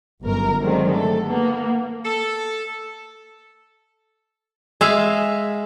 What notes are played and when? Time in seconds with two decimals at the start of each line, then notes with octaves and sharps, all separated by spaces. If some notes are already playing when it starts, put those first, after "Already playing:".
0.23 G1 F#2 A#4
0.61 D3 D#3 F#3 G#3 A3 C4
0.91 A3 A4
1.25 A#3 B3
2.04 A4
4.81 G#3 E5 F5